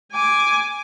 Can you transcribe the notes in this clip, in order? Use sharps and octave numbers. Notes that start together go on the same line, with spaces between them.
G#5 D6